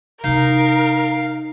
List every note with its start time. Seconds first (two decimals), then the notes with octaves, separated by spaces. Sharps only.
0.24 C3 D#4 E4 A#4 F5